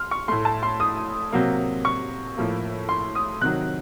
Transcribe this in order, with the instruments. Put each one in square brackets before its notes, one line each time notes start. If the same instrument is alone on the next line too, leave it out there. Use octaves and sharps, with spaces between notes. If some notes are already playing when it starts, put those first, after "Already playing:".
Already playing: [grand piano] C6 F6
C#6
A2 A3 C6
A5
C6
D#6
C3 F#3 A#3
C#6
A2 F3 A#3
C6
D#6
C3 D#3 F#3 F#6